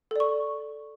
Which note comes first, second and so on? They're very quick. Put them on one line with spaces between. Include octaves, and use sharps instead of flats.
A4 D5 C#6